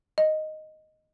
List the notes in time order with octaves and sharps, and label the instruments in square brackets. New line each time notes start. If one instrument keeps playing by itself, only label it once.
[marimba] D#5